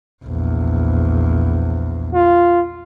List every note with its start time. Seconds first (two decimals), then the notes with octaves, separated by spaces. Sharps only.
0.25 A#1 E2
2.14 F4